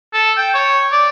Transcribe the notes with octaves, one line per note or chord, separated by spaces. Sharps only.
A4
G5
C#5
D5